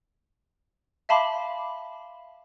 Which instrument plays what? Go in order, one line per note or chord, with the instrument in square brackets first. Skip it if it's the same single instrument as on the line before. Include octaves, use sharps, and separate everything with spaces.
[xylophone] E5 F5 A5 B5 C6 D6